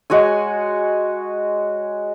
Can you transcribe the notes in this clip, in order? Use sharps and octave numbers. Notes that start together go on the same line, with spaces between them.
G#3 F#4 C#5 G#5